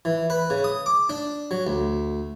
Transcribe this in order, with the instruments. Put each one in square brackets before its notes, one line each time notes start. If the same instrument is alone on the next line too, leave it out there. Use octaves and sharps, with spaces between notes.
[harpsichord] E3
B4
C#3
D#6
D6
D4
F#3
D2